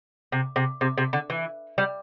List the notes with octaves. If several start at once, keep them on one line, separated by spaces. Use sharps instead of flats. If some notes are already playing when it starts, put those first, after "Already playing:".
C3
C3
C3
C3
D3
E3
G3